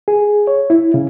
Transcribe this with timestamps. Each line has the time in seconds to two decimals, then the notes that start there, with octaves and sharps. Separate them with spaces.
0.08 G#4
0.47 C#5
0.70 E4
0.94 C#3